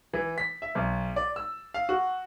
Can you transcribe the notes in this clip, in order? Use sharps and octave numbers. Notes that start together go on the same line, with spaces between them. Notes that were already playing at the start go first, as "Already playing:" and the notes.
E3
B6
E5
B1
D5
E6
F5
F#4